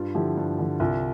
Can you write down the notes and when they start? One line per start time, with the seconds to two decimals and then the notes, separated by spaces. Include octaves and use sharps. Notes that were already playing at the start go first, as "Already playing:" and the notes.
Already playing: G2 F4
0.15 D3 F3 E4 G4
0.37 G2
0.58 D3 F3
0.80 C2 F4